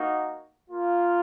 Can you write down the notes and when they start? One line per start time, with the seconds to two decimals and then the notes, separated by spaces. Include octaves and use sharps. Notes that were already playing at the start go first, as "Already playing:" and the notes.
Already playing: A#3 D#4 F#4
0.68 A#3 F4